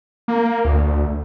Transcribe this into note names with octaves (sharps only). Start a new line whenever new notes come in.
A#3
D2